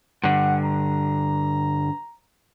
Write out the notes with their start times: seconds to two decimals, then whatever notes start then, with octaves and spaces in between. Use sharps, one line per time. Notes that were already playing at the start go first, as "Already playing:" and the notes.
0.23 G2 D3 F#5
0.63 A#5